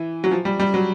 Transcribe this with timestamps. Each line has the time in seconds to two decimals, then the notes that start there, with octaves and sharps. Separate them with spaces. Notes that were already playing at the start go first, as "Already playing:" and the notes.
Already playing: E3
0.24 F#3
0.31 F3
0.45 G3
0.59 G3
0.74 F#3